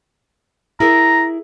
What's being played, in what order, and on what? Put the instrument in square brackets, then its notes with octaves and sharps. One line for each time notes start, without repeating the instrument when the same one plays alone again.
[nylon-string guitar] E4 G#4 A#4 [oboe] A#5